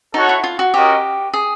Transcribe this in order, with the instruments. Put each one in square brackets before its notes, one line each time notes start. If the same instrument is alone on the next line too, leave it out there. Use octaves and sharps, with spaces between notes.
[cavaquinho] D#4 [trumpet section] F#4 A4 C#5 F#5
[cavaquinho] E4
F4
F#4
[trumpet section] C#4 F#4 A#4 D#5 [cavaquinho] G4
[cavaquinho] G#4